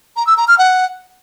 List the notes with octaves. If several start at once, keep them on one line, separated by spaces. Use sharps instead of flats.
A#5
E6
A#5
F6
F#5